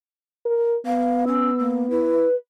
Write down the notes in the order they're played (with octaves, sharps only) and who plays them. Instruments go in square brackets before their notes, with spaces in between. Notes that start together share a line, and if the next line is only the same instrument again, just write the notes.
[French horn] A#4
[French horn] B3 [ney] F5
[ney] C#4 [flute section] E6
[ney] A#3
[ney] E4 [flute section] B4